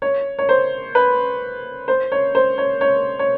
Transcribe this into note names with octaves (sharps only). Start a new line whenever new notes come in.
C#5
C#5
C5
B4
C5
C#5
C5
C#5
C#5
C#5